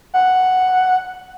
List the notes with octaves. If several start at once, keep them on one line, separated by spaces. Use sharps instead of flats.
F#5